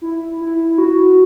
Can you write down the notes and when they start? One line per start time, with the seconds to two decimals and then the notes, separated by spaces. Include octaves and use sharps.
0.02 E4
0.41 E4
0.78 F#4